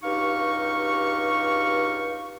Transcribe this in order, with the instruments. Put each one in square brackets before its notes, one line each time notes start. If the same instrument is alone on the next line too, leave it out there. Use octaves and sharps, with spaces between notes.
[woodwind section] C#2 G2 D#4 G4 F5 C#6